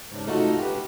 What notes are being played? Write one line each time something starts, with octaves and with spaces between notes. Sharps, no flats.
G#2 C#3 D4
A3 D#4 F4 F#4 G#4 A4
G4 B4